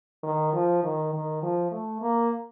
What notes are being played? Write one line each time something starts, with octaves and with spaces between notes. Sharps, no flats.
D#3
F3
D#3
D#3
F3
A3
A#3